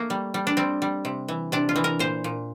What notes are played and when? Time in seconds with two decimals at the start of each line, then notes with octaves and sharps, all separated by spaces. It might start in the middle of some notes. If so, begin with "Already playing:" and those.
Already playing: A3 A#3
0.10 G3
0.34 G3
0.47 D4
0.57 G3 C4
0.82 G3
1.05 C3
1.28 E3
1.52 C3 D4
1.69 F4
1.76 E3
1.84 A#4
1.99 A#2 C5
2.24 A#2